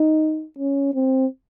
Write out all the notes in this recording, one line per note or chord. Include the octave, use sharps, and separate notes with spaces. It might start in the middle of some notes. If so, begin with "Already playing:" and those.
Already playing: D#4
C#4
C4